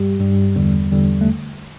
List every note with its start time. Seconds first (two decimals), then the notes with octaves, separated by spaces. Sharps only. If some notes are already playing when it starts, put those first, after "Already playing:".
Already playing: G2 G3 G4
0.20 G2 G3
0.56 E2 D3 G3
0.92 E2 D3 G3
1.21 A3